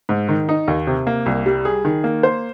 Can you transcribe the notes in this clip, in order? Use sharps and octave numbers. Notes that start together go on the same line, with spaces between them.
G#2
D#3
D#4
D#2
C3
A#3
C2
G3
G#4
D#3
A#3
C5